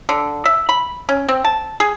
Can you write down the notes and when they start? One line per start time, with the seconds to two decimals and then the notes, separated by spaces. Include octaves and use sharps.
0.09 D3
0.45 E5
0.69 B5
1.09 C#4
1.28 C4
1.44 A5
1.80 G#4